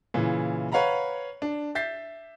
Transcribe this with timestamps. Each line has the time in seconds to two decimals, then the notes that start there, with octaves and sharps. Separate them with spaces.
0.14 A#2 C#3 E3
0.72 B4 C#5 F5 F#5 A#5 B5
1.42 D4
1.75 E5 G6 A6 B6 C7